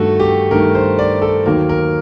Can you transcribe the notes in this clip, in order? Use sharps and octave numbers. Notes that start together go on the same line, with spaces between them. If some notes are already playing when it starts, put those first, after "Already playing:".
Already playing: G2 D#3 A3 F#4 A4
G4
G2 D#3 A3 A#4
C5
D5
A4
D#2 D#3 F#3 A#3 A#4
A#4